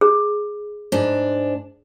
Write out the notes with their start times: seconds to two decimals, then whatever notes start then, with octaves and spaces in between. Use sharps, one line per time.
0.01 G#4
0.92 G#2 D4